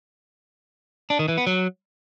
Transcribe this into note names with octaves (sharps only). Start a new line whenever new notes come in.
D4
D#3
E3
B3
F#3